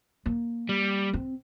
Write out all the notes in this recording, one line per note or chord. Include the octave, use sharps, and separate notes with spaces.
A#3
G3
C4